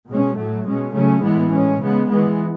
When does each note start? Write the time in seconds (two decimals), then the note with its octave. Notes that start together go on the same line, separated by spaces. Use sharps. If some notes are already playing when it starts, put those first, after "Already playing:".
0.09 B2 G#3 C#4
0.38 A2 F#3 A3
0.66 B2 G#3 C#4
0.95 C#3 F#3 A3 C#4
1.24 A2 E3 G#3 B3
1.52 A2 G#3 C#4
1.81 C#3 G#3 B3
2.10 E3 G#3 B3